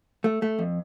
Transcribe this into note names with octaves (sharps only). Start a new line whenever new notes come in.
A3
A3
F2